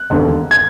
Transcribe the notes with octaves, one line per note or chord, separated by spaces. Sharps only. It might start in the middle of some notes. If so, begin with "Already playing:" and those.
Already playing: F#6
E1 D#2 D3
G#6